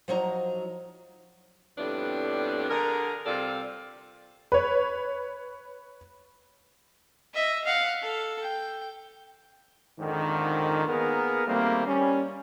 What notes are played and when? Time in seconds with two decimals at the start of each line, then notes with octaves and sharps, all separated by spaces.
0.08 F3 F#3 D#4 A#5
1.78 F2 A2 G3 B3 D4
2.69 D3 G#4 A#4
3.26 C3 G3 F4 A4 D5
4.52 B4 C#5
7.35 D#5 E5
7.64 F5 F#5
8.01 A4
8.41 G5
10.00 F2 G#2 D3 D#3
10.87 A#3 B3 G#4 A#4
11.46 D#3 G3 A3 A#3 C4
11.87 G3 C#4